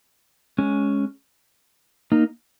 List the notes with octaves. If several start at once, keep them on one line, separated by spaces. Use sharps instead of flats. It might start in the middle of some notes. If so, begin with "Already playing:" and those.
G#3 C#4
A#3 D#4